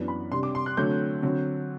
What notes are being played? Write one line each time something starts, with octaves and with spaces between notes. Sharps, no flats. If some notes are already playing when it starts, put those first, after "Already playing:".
Already playing: F#2 E3 B3 D4
B5
C3 G3 D4 C6
D6
C6
F#6
D3 F#3 A3 C4 G6
D3 F#3 C4